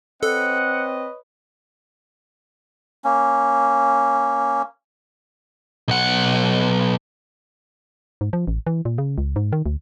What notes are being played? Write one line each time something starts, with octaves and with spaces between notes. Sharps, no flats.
C4 A4 B4 C#5 D#5 F#5
A#3 C#4
B1 F#5
G#2
F3
A1
E3
A#2
C#3
C#2
G#2
D#3
D2